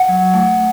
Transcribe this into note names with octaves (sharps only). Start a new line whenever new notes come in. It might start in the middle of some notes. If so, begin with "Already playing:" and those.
Already playing: F#5
F#3
A3